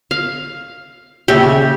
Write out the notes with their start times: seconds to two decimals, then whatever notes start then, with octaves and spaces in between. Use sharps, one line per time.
0.11 F5
1.28 D#2 C#3 G4 E5